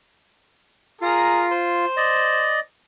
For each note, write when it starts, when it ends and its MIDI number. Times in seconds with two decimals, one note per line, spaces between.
1.01 1.85 65
1.01 1.48 68
1.01 1.48 70
1.01 1.48 82
1.51 2.61 72
1.97 2.60 74
1.97 2.60 75